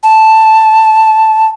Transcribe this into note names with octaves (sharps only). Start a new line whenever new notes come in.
A5